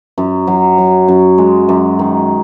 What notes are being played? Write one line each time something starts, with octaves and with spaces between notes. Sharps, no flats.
F#2
F#3
F#3
F#2
G#3
F#2
D#3